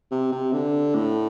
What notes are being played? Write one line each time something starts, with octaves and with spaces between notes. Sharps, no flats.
C3
C3
D3
A2